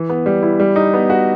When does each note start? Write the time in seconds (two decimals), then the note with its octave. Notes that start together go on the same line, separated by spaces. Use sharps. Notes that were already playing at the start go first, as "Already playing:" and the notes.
Already playing: E3
0.09 B3
0.26 G3
0.43 E4
0.60 G3
0.76 D#4
0.94 B3
1.10 F#4